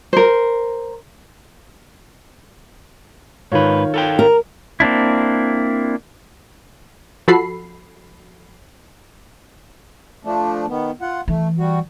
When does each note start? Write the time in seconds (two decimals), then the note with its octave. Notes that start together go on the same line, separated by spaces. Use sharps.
0.13 A#4 C5
3.52 G#2 D#3 F4 B4 C#5
3.94 A4 F5 G5
4.19 A#4
4.80 A#3 C4 D4 E4
7.28 F3 F#4 A4 B5 C7
10.25 F3 A3 D4
10.68 D#3 B3
11.01 F4 F#5
11.28 E3 A3
11.59 G3 F#4